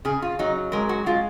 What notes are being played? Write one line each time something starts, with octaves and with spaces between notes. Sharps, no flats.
C#3 G#4
F4
F#3 D#4
G#3 A#4
F#4
G#3 F4